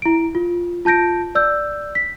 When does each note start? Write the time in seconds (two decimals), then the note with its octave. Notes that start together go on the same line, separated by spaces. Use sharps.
0.02 E4 D7
0.35 F4
0.85 F4 A5 G6 A#6 D7
1.35 D5 E6 G6
1.95 B6